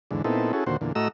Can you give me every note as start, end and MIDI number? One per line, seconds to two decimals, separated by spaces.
0.11 0.22 40
0.11 0.22 44
0.11 0.22 50
0.24 0.52 46
0.24 0.52 59
0.24 0.52 60
0.24 0.52 63
0.24 0.52 64
0.24 0.52 69
0.53 0.64 61
0.53 0.64 64
0.53 0.64 66
0.53 0.64 68
0.53 0.64 69
0.66 0.77 39
0.66 0.77 46
0.66 0.77 50
0.66 0.77 66
0.66 0.77 72
0.81 0.92 40
0.81 0.92 46
0.81 0.92 50
0.95 1.08 45
0.95 1.08 57
0.95 1.08 66
0.95 1.08 75
0.95 1.08 82
0.95 1.08 88